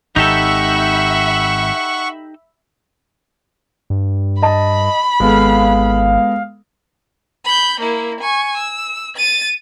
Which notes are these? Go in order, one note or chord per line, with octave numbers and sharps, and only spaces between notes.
G#1 D#4 G4 A4 E5 F#5 B5 C#6
G2
D#5 A5 B5
G#1 G#3 B3 A4 F5
B5 G6
A#3 E4
G#5 C#6
E6
A6 D#7